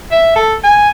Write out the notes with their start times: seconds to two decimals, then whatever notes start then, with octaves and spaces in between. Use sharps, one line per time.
0.12 E5
0.36 A4
0.64 G#5